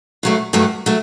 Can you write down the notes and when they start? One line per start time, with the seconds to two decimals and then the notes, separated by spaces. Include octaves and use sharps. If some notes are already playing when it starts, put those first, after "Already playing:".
0.23 G2 F#3 A3
0.53 G2 F#3 A3
0.86 F#3 A3